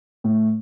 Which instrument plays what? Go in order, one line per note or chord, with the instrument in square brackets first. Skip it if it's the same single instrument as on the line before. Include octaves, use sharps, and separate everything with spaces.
[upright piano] A2